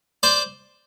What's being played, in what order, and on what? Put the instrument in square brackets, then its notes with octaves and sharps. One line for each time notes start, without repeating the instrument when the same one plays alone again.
[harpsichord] C5 D5